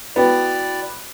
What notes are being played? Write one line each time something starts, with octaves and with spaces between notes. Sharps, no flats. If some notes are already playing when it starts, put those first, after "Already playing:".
B3 E4 F#4 D5 G5